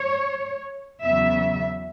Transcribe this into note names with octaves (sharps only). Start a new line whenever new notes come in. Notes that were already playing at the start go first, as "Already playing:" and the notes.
Already playing: C#5
E2 C#3 F#3 B3 E5